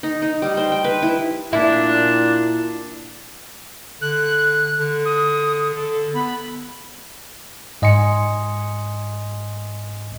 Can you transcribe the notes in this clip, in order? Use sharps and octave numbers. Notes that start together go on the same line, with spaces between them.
D#4
D#4
G3
C5
G5
B4
E4
A#2 D4 E4
D3 F#6
D3
D#6
D3 A4
B3 B5
G#2 D#5 G#5 C6 C#7